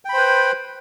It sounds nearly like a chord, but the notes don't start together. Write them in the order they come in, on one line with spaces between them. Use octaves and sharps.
G5 B5 C5 B4